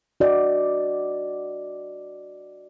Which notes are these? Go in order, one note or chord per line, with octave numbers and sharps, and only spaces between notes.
F#4 D5 D#5